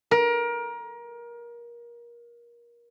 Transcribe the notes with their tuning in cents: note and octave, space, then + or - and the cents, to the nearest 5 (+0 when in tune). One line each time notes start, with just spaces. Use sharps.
A#4 +25